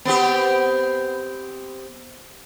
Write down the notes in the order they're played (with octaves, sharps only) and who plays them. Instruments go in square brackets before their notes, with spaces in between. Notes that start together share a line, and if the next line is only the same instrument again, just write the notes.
[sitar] B3 C4 G4